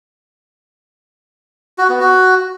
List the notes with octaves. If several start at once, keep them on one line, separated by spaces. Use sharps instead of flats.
F#4
B3
F#4